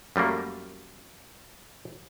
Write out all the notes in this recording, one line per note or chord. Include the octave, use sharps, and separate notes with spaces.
F#2 G3 A3 A#3